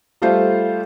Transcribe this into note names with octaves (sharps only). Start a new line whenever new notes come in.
G3 A3 F4 C5